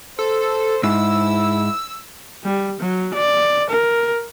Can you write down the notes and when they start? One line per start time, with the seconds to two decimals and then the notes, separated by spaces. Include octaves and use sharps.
0.19 A4 C5
0.83 G#2 E4 E6
2.44 G3
2.80 F#3
3.14 D5
3.70 A#4